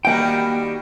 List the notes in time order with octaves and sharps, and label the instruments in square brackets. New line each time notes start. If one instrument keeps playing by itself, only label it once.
[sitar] D#3 G3 F#4 [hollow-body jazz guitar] A#3 G5